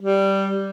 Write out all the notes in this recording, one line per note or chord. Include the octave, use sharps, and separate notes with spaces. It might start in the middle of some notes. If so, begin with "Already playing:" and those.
G3